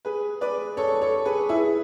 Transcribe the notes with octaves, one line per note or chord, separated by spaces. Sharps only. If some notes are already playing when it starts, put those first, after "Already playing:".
G#4 B4
B4 D5
A4 C#5
A4 C#5
G#4 B4
E4 G#4